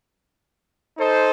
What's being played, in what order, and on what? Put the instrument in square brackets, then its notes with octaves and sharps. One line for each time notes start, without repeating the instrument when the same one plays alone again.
[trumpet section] D#4 A4 C5 D#5